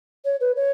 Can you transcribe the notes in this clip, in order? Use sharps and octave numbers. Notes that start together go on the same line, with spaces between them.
C#5
B4
C#5